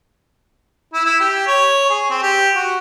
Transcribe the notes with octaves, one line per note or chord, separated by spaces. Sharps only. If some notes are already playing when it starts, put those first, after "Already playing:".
E4
E4
G4
C#5
G#4
C4
G4
F#4